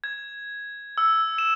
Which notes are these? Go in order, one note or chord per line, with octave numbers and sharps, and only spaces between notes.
G#6
E6
E7